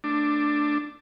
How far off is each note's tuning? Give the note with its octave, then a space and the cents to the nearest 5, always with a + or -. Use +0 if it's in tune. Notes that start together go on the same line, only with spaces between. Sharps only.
A3 +20 D4 +10